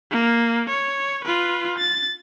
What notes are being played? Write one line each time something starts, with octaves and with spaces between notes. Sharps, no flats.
A#3
C#5
F4 B4
A6